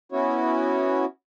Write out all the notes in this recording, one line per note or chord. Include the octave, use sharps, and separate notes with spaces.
B3 C#4 E4 F#4 C#5